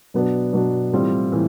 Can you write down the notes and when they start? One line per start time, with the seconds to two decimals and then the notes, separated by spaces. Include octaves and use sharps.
0.14 B2 F#3 B3 D4
0.53 B2 F#3 B3 D4
0.93 A2 E3 G3 C4 F4
1.32 A2 E3